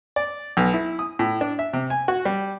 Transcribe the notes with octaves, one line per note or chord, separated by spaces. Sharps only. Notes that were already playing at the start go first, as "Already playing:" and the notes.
D5
B1
E4
D#6
A2
D4
E5
C3
G#5
F#4
G3